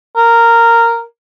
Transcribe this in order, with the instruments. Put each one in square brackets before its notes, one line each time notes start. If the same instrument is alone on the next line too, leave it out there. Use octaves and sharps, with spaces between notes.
[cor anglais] A#4